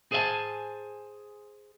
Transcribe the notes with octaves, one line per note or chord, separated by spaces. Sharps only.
G#4 C5 D5 E5 G#5 A5